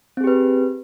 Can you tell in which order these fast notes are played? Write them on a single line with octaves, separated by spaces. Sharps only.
C4 G#4 G4 B4